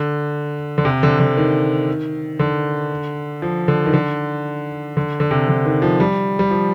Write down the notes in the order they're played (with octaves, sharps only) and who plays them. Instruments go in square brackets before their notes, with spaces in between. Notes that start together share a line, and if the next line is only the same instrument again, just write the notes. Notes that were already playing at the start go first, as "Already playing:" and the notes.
Already playing: [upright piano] D3
D3
C3
D3
D3
D#3
D3
F3
D3
D#3
D3
D3
D3
C3
D3
D#3
F3
G3
G3
F3